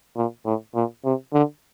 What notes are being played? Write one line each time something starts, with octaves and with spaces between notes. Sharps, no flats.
A#2
A2
A#2
C3
D3